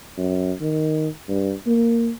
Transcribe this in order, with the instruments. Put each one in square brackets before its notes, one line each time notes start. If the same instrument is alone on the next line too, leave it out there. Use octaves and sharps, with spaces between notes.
[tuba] F#2
D#3
G2
A#3